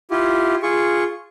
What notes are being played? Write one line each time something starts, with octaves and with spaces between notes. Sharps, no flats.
E4 F4 G4
F4 G#4 C#6